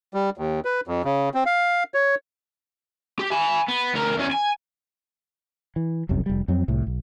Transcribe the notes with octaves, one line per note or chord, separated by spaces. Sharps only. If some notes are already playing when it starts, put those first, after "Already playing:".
G3
D#2
B4
F2
C#3
C4
F5
C#5
G4
G#5 B5
B3
D2 A#4
E2 C#4
G#5
E3
F1 C2 F#2 C3
F1 G3
F2 F#3 C4
C2 A2
B1